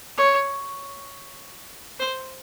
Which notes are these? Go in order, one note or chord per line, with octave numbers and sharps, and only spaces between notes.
C#5
C5